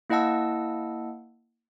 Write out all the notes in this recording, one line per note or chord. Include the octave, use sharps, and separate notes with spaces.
A#3 E4 D#5 F#5 A5 E6